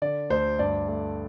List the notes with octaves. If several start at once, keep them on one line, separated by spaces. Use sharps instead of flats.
D3 D5
D2 C5
G2 D5
A3